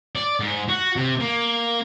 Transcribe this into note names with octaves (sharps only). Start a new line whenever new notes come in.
D5
G#2
F#4
C3
A#3